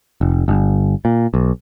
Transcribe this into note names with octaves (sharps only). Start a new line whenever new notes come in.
F1
G1
A#2
B1